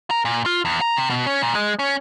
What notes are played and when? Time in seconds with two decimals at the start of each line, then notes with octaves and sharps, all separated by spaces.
0.11 A#4
0.25 A#2
0.46 F4
0.65 E2
0.81 A#5
0.96 C3
1.10 B2
1.27 C#4
1.42 A#2
1.55 G#3
1.79 C#4